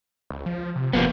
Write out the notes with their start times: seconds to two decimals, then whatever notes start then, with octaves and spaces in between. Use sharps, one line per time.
0.30 C#2
0.46 F3
0.76 C3
0.93 F1 F3 A#3 B3